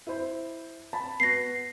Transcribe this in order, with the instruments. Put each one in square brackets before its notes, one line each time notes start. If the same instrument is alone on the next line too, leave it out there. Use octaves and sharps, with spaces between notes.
[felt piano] E4 C5
A5 B5
[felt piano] B3 F#4 [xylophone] A#6 C7